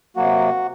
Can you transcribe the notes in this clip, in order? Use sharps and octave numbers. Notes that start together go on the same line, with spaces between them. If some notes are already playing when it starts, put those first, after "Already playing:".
C3 F#3 A#3 F#4